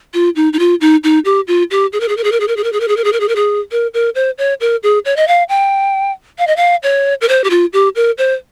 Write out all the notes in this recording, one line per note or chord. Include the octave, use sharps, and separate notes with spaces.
F4
D#4
D#4
F4
D#4
D#4
G4
F4
G4
G#4
A#4
G#4
A#4
G#4
A#4
G#4
A#4
G#4
A#4
G#4
A#4
G#4
A#4
G#4
A#4
G#4
A#4
G#4
A#4
A#4
C5
C#5
A#4
G#4
C#5
D#5
F5
G5
F5
D#5
F5
C#5
A#4
C5
G4
F4
G4
A#4
C5